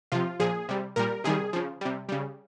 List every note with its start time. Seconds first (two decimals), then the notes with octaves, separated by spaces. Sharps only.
0.12 C3 F3 F4
0.40 A#2 F3 G#4
0.69 C3 G3
0.96 A#2 G3 A#4
1.24 C3 D#3 G3 G#4
1.53 C#3 F3
1.81 C3 G3
2.09 C#3 G3